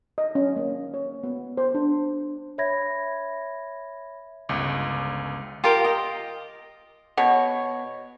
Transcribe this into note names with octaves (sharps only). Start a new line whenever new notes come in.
D#5
C#4
A#3
C#5
B3
C5
D4
C#5 E5 B5 G#6 A#6
G1 C#2
F4 G4 A#4
D#5
B2 C#5